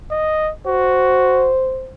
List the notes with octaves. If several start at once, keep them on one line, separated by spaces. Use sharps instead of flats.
D#5
F#4 C5